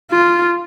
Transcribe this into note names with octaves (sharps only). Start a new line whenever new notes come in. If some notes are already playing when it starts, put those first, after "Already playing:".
F4